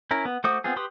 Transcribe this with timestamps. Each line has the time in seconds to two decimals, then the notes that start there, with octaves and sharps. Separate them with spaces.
0.11 C#4 E4 A#4
0.25 B3
0.44 A3 F#4 C5 D6 D#6
0.64 B3 C4 F4 G#4
0.76 G4 B4 C6 D#6